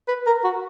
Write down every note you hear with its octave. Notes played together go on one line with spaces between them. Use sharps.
B4
A#4
F#4